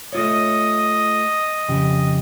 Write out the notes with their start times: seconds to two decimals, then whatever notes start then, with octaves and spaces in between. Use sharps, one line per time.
0.13 A3 F4 C#5 D#5
1.68 F2 C#3 G4